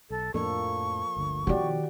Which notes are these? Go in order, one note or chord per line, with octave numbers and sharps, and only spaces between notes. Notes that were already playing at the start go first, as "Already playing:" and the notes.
B1 A4
F2 A2 F3 A#3 D4 A4 C#6
G1 D2 D3
B2 D#3 F3 E4 F#4 G4 D5